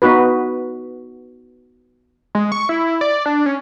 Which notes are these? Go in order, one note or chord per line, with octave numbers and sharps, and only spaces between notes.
B3 D#4 F#4 B4
G#3
C#6
E4
D5
D4
C#4